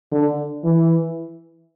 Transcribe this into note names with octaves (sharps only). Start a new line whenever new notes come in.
D3
E3